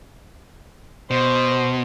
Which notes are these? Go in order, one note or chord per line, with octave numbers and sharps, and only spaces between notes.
B2 C5